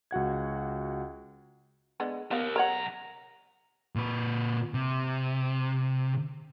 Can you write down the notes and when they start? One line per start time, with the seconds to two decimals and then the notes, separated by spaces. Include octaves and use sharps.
0.11 C#2 F#4 F#5 G#6
2.00 D3 G#3 B3
2.31 B3 G4 A#4 F5
2.56 B1 A#4 C#5 F#5 A#5
3.96 A#2 B4
4.74 C3